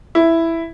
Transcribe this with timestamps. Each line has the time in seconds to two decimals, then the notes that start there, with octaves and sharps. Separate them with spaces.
0.15 E4